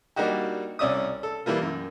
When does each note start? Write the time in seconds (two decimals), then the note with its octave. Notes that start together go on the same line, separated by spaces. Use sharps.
0.16 G3 A#3 D4 D#4 F#4 G4
0.79 C2 C#4 D5 E5 D#6
1.23 A4
1.46 E3 G3 A#3 F4
1.62 F#2